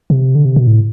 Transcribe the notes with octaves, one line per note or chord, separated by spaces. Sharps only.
C3
D3
C3
B2
A2